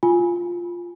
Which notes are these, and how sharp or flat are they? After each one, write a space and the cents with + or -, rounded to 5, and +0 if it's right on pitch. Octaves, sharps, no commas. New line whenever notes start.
F4 +0 G#5 +0